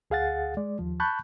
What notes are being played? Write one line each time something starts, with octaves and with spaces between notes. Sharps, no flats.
D2 G#4 F5 F#5 A6
G#3 D5
D#2 F3
A5 B5 C#6 F#6 G6